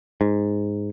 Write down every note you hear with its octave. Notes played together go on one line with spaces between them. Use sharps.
G#2